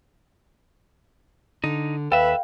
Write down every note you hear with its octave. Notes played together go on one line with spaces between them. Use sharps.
D3 D#4
D#2 A4 B4 E5 F5 G5